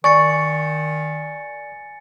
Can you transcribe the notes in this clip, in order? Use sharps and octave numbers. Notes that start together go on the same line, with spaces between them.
D#3 D5 G#5 C#6 A6 C#7